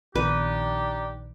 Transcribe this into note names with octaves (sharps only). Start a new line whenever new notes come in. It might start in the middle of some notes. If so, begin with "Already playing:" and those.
A#1 D#3 B3 D4 D#4 G4 B4